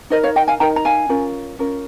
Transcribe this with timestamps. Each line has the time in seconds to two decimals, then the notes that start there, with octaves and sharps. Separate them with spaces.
0.10 D#4 A#4 C5 D#5
0.23 C#5 F5
0.36 D#5 G5
0.48 F5 G#5
0.60 D#4 A#4 G5 A#5
0.76 A#5
0.85 F5 G#5
1.09 C#4 F4 A#4
1.59 C#4 F4 A#4